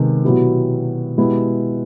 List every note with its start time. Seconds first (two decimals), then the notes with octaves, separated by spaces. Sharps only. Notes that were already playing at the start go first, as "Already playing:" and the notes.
Already playing: C3 D#3 G#3 B3
0.24 B2 F#3 B3 E4 G4
1.18 B2 G#3 B3 E4 G4